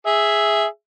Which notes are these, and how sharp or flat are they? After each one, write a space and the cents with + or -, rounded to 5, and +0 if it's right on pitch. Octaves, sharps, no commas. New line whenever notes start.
G#4 +0 E5 +0